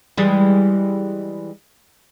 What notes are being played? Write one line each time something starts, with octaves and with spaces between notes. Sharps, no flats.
E3 G3 G#3